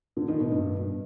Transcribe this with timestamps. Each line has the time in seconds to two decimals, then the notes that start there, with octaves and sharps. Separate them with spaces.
0.16 D3
0.28 D#3
0.40 B2
0.52 G2